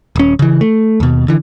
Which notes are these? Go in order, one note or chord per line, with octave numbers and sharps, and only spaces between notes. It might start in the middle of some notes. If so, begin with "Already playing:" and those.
D#1 C#4
C#3 E3
A3
D#2 B2
D3 E3